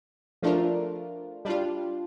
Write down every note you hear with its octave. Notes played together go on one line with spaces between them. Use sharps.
F3 A3 D4 F4 A#4
G3 D4 F4